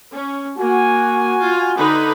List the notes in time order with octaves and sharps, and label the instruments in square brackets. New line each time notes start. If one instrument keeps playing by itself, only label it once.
[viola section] C#4
[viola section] A#3 [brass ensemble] F#4 G#5
[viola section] F4
D3 D#4 B4